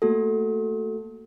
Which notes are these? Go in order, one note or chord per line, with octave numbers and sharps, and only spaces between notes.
A3 A#3 F#4 A4